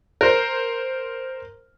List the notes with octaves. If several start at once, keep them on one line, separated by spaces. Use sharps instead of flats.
A#4 C5